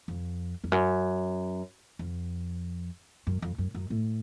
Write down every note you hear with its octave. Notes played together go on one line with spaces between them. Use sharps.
F2
F2
F#2
F2
F#2
F2
F#2
F#2
A2